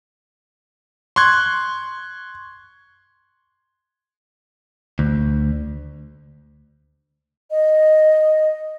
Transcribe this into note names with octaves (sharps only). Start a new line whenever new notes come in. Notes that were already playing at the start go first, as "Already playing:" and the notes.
C6 C#6 F#6 G#6
D2
D#5